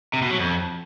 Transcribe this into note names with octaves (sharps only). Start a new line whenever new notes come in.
C3
B2
F#3
F2